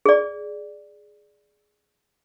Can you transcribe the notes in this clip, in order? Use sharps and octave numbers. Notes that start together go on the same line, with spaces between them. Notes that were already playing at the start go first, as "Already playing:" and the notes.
G#4 D5